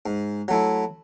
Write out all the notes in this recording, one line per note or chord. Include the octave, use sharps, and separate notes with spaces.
G#2
F#3 A3 E4